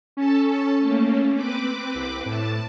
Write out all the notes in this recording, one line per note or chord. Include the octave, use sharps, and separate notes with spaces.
C#4 A4 A5
A3 A#3
C4 B4 D6
C2
A2 A5